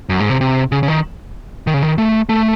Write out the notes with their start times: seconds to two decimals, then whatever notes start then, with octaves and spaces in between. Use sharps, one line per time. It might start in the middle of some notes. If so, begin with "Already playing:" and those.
0.09 F#2
0.20 G#2
0.30 C3
0.41 C3
0.72 C#3
0.83 C#3
0.88 D#3
1.67 D#3
1.74 C#3
1.82 D#3
1.98 A3
2.29 A3